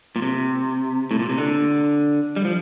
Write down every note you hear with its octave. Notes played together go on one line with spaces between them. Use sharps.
A#2
C3
A2
A#2
C3
D3
G3
F3